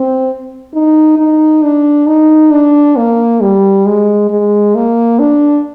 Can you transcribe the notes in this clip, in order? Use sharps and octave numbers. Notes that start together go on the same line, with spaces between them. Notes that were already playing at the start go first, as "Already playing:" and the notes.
Already playing: C4
D#4
D#4
D4
D#4
D4
A#3
G3
G#3
G#3
A#3
D4